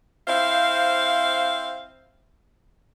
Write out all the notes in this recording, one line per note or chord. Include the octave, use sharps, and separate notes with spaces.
C4 E4 C5 F5